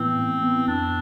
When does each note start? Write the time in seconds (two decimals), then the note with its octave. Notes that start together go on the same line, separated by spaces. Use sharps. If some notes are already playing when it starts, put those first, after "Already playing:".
Already playing: A2 E3 B3 C4 E4 B4
0.15 A2
0.41 E3 B3 E4 B4
0.68 F2 D4